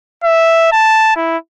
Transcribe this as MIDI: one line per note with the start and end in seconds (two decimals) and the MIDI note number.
0.24 0.70 76
0.72 1.14 81
1.16 1.37 64